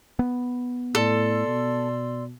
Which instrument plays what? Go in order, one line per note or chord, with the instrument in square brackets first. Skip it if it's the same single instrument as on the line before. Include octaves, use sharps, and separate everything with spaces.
[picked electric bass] B3
[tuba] A2 [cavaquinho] A4 [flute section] D5 C6 E6
[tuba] B2